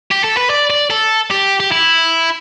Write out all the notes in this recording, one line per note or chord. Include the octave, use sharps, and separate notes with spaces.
G4
A4
B4
D5
D5
A4
G4
G4
E4